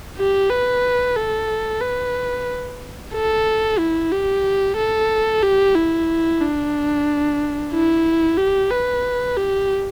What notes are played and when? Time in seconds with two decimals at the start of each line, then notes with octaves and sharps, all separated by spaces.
0.18 G4
0.51 B4
1.16 A4
1.81 B4
3.14 A4
3.79 E4
4.11 G4
4.77 A4
5.43 G4
5.75 E4
6.41 D4
7.73 E4
8.37 G4
8.71 B4
9.37 G4